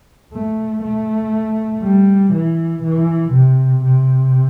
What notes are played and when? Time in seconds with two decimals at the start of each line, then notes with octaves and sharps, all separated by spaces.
0.34 A3
0.83 A3
1.83 G3
2.32 E3
2.83 E3
3.33 C3
3.84 C3